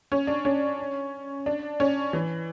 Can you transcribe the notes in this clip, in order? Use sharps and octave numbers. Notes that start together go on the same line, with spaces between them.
C#4
D4
C#4
D4
C#4
E3